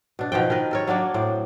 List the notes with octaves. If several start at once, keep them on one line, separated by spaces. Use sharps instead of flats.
B2 D4
B2 D#3 F3 G5
D#3 A#4 B4
A4 A#4 C#5
F#3 A#3 D4 D5
A2 C5 D5